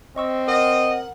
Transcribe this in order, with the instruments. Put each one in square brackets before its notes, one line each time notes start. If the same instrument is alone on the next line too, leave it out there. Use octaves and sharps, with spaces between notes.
[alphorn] C4 [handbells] D#5 C#6 E6
[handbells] A#4 [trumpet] D#5 [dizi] F#5